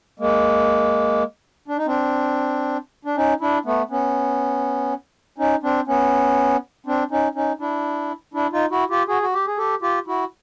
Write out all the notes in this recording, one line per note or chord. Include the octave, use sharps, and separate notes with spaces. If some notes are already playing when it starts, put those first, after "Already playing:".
G#3 A#3
D4
D#4
C4 D4
D4
C#4 D#4
D4 E4
A3 B3
B3 C#4
C#4 D#4
C4 D4
B3 C#4
C4 D4
C#4 D#4
C#4 D#4
D4 E4
D4 E4
D#4 F4
E4 F#4
F4 G4
F#4 G#4
F#4
G4
G#4
G4 A4
F4 G4
E4 F#4